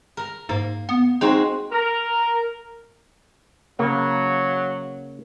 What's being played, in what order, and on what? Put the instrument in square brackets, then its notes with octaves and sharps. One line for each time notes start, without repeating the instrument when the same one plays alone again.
[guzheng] A#4 A#5
[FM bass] G#2 [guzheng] A#3
[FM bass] B3
[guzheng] G#3 C4 F#4 [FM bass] D#4
[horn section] A#4
[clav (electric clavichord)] C#3 A#3 [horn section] F#3